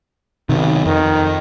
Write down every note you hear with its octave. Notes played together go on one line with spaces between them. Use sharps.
B1 C3 D#3
F2 D#3